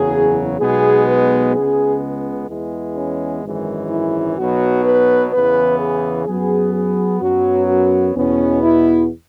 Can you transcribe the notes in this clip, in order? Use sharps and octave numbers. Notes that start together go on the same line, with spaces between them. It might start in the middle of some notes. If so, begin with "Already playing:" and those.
Already playing: F#1 E2 C#3 F#3 G#4
B1 B2 G#3 B3 G#4
B4
C#2 C#3 G#3 B3 G#4
E2 E3 G#3 B3
C#4
G#1 F#2 E3 G#3
E4
B1 B2 F#3 B3 F#4
B4
E2 C#3 E3 B3 B4
G#4
F#2 F#3 B3 G#4
G#4
F#2 F#3 B3 F#4
F#4
E2 B2 B3 C#4
E4